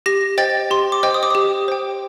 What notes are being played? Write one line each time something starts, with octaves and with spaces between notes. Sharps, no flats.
G4 A#6
C5 D#5 G5 A6
G4 C6
D6
C5 D#5 G5
D#6
D6
G4 D#6
C5 G5